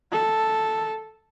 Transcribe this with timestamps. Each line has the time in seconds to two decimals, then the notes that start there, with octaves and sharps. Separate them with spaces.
0.12 A4